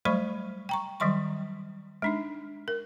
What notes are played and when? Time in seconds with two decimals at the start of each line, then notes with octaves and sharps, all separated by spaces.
0.05 F#3 G3 A3 C5 B5 C#6
0.69 G5 A#5 C#6
1.00 D#3 F#3 G3 C6 C#6
2.02 G#3 D4 D#4
2.68 A#4